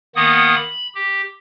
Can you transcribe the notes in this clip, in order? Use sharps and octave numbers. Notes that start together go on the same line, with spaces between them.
D#3 A#3 B3 F#5 D#6
B5
G4